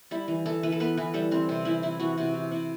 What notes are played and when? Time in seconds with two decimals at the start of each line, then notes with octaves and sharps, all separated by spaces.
0.11 G3 E4
0.28 E3
0.46 E3 A4
0.63 E3 B4
0.72 A4
0.80 B3 B4
0.97 E3 B4
1.14 G3 A4
1.31 E3 C4
1.49 C3 C4
1.65 E3 E4
1.83 E3 E4
2.00 E3 F#4
2.18 C3 F#4
2.34 E3
2.52 C3 E4